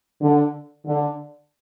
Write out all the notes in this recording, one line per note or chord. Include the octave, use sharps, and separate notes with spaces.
D3
D3